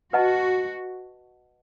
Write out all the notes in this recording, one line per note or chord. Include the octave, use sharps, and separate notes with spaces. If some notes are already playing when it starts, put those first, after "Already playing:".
F#4 B4 D#5 F#5 A5